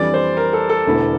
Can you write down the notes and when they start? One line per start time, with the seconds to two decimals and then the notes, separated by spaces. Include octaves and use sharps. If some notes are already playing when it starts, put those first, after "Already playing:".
Already playing: F2 E3 G3 D4 D5
0.14 C5
0.37 A#4
0.53 A4
0.69 A4
0.86 E1 E2 D3 A3 E4